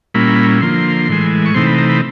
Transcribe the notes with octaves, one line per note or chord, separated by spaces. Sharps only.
A#2 G3 A#3 C#4 E4 B5
D3 F3 A#3 C6
A2 E3 G#3
C#6
C3 E3 A3 C4 D#4 C6
B5
A#5
B5